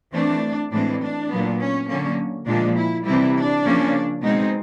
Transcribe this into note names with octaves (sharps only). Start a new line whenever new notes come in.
E3 A3 C4 D4
A2 E3 G#3 C4 D4
D4
A#2 F#3 B3
C#4
D3 F#3 A#3 C#4
A#2 F3 G#3 D4
E4
C3 E3 G3 C4 E4
D4
C#3 F3 A#3 C#4
B2 G#3 C4 D#4